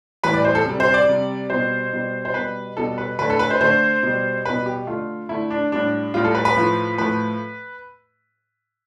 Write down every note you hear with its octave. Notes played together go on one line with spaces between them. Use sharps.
A2 E3 G3 B4
D5
C5
A4
C3 G3
C5
D5
C3 G3
B2 G3 C5
B2 G3
C5
B2 G3 B4
B2 G3 A4
B4
D3 A3 B4
A4
B4
C5
D3 A3 C5
B2 G3
B2 G3 B4
G4
D3 A3 F4
D3 A3 E4
D4
A2 G3 D4
A2 G3 F4
A4
B4
B4
A2 F3 A3
A2 F3 A3 B4